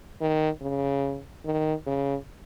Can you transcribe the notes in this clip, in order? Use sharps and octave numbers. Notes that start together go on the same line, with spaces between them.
D#3
C#3
D#3
C#3